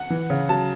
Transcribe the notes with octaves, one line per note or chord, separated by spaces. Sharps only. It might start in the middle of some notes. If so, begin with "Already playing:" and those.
Already playing: F#5
E3
C#3
F#3 A5